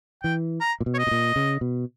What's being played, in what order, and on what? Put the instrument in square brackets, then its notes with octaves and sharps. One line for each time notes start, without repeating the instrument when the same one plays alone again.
[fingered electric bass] E3 [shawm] G5
[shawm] A#5
[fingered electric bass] A#2
B2
[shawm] C#5
D#5
[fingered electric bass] B2
A#2
C#3
B2